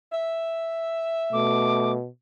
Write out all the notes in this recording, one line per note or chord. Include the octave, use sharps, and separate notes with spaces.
E5
B2 A3 D6